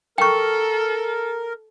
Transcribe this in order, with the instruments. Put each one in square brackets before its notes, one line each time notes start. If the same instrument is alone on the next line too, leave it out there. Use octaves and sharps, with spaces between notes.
[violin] A4 [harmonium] A#4 [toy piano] G5 C#6